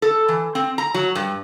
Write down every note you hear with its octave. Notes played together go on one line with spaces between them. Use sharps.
A4
E3
C4
A#5
F#3
G2